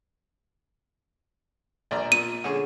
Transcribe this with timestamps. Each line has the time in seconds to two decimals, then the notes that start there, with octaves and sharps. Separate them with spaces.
1.91 A#1 D5 A#5
2.12 A#2 D#7
2.44 D3 C#4 G#4